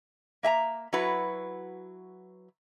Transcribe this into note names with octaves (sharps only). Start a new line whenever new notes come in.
A#3 E5 G#5 A#5
F#3 E4 F#4 B4